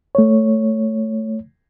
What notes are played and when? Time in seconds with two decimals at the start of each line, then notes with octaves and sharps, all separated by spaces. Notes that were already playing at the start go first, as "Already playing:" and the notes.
0.15 A3 C#5